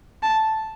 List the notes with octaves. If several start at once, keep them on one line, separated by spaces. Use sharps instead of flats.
A5